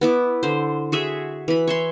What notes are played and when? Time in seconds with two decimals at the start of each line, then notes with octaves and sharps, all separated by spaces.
0.01 B3 E4 D6
0.43 D3 C5
0.92 F#4 G#4 E5
1.48 E3 B5
1.67 C#5 E5 C6